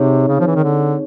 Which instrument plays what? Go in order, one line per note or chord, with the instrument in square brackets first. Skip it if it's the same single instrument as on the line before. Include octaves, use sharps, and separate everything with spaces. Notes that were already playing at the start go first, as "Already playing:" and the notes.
Already playing: [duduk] C3 [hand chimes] C4 D#4 G#4 C#5
[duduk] C#3
F3
E3
D#3
D3